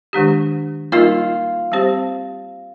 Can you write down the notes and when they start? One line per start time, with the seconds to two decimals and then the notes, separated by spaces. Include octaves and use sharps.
0.13 D#3 G#3 D4 G4
0.92 G3 A#3 D#4 F4 A#4 D#5
1.72 G3 C4 G4 C5